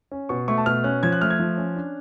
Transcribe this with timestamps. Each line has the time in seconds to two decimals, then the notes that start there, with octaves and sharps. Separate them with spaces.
0.12 C#4
0.29 B2 C#6
0.48 A3 C#6
0.57 A5
0.66 B2 F6
0.84 C#4 F#6
1.03 F3 G#6
1.12 F#6
1.21 A3 F6
1.30 G#6
1.40 F3
1.57 C#4
1.76 D4